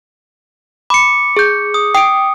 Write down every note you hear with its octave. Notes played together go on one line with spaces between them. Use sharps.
B5 D6 C#7
G#4 G6
D#6
G5 D#6 D7